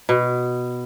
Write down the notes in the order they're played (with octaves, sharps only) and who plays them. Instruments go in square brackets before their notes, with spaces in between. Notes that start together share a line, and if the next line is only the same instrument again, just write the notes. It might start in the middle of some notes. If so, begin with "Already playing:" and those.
[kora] B2